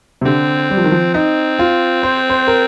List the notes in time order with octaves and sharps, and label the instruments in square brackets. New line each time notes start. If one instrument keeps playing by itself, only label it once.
[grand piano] C3
[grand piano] D3 [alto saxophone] C4
[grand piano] G3
F3
D#3
F3
[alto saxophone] C4 [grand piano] D#4
[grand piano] F4
C5
C5
A#4